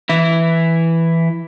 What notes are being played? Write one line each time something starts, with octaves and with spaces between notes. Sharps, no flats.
E3 E4